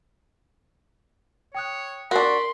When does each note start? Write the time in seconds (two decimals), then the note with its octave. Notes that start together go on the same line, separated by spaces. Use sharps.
1.55 C#5 G5 D#6 F#6
2.11 D4 F#4 A#4 B5 C6